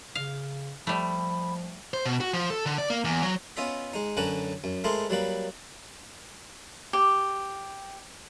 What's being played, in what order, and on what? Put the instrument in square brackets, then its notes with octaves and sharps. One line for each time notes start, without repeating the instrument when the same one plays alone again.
[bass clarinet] C#3 [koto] F5
[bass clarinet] F3 [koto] G3 A3 [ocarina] B5
[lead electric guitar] C5
B2
F#4
F3
A4
D3
D5
A#3
E2
F#3
[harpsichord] B3 C#4 F4 D#5 E5
G#3 D#4
F#2 D3 C#4 F#4 B4 A#5
F#2
G#3 A3 E4 A#4 C5 D#5
F#3 G3 A#3 B4
[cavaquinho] G4